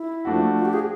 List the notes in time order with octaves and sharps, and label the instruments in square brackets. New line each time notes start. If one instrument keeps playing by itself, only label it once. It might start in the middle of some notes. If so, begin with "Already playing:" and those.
Already playing: [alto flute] E4
[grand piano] F3 A3 D4 F#4
[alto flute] F4
G4
G#4